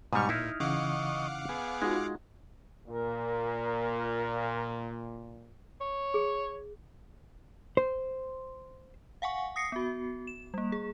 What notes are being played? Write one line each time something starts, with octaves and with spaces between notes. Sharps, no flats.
G#2 B2 G3 C#6 D#6 F6
A#2 D#4 E4
C#3 E3 D#5 F5 F#5 C#6 D6
B3 G#4
G#3 D#4 F4 F#4
A#2 A#4
C#5
G#4
C5
F5 F#5 G#5 C#6
D#6 A#6 C7 C#7
B3 F#4
E7
G3 A#3
G#4